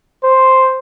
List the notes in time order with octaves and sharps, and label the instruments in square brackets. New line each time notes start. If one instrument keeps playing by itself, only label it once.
[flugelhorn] C5